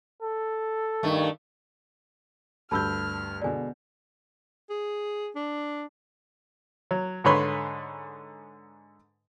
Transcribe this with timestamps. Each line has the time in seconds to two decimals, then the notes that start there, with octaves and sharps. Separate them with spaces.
0.23 A4
1.03 G2 D#3 A3
2.71 D2 G2 A5 B5 E6 F6 G6
3.42 B2 D3 G#3 D5 G#5
4.70 G#4
5.36 D4
6.91 F#3
7.24 G#2 D3 B4 C#5 B5 C6